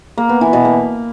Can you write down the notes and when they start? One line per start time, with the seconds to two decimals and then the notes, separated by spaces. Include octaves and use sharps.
0.18 A#3
0.29 B3
0.41 E3
0.53 B2
0.65 A#3